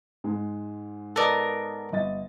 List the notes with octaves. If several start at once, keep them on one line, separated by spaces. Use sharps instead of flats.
G#2 G#3
B3 A4 A#4 D5 D#5
G1 D#5 A6